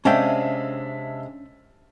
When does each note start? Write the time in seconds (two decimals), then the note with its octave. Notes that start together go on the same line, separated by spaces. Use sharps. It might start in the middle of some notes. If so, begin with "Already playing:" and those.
0.05 C3 G#3 C#4 D4 E5 F5 G5 A5